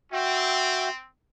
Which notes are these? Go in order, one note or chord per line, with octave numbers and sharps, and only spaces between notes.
C4 F#4 E5 G5